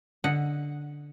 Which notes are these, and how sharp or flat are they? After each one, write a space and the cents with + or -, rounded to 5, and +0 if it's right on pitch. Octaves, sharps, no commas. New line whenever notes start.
D3 -5 D#5 +0 F#5 +0